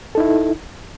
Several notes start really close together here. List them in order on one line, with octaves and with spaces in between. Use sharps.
A4 D#4 E4